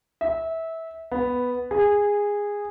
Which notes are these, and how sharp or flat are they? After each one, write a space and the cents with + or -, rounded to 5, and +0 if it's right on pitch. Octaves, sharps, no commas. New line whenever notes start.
E5 -20
B3 +0
G#4 -15